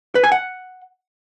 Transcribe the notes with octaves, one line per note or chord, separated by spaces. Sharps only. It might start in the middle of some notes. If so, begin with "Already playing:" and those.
B4
G#5
F#5